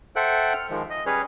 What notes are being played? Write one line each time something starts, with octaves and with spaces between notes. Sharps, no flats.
A4 C5 E5 F#5 G5 F#6
F6
D#3 F3 G#3
D#5
G3 C#4 G#4 B4 C#5